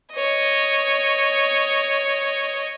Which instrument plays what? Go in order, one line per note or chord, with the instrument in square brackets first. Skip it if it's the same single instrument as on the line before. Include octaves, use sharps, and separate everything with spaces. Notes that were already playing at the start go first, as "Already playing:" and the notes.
[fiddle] C#5 D#5